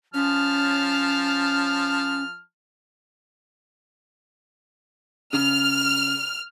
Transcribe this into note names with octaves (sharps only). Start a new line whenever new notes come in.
F3 C#4 A5 F6
C#3 F6